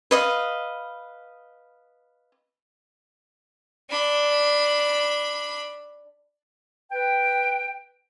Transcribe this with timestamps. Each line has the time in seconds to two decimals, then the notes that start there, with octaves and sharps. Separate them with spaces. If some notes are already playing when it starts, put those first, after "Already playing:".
0.11 B4 D#5 F5
3.90 D4 B5
6.92 B4 G5